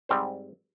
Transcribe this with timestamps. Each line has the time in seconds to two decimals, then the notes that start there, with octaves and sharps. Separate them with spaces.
0.09 G#2 G3 C4 C5